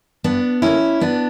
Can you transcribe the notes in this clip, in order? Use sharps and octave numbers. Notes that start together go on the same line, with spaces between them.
G2 B3 D4
D3 A#3 C#4 E4
G2 B3 D4